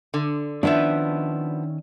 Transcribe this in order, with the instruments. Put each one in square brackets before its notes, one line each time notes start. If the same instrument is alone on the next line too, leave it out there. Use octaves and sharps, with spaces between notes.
[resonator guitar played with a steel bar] D3
[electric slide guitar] D#3 C#4 E5 [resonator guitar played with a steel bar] F3 B3 E4 [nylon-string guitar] D4